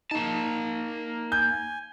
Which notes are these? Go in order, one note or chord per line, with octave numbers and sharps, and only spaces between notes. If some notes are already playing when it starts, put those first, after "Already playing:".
A#3 D#4 A5
G#5 G6